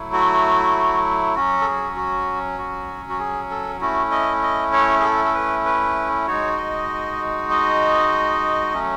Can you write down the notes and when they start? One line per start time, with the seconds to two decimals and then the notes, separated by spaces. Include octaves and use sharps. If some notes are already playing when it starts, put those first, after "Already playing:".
Already playing: F#3 A3 E4
0.13 F#4
1.35 F#3 C#4 F#4
1.62 A4
1.66 G#4
1.96 F#4
2.58 F#4
3.09 F#4
3.19 G#4
3.51 A4
3.81 A3 C#4 E4 F#4
4.11 D#5
4.43 D#5
4.73 C#5
5.00 G#4
5.04 A4
5.25 A4
5.35 B4
5.65 B4
6.27 G#3 D#4 F#4 C#5
6.57 D#5
7.50 D#5
8.72 F#3 A3 C#4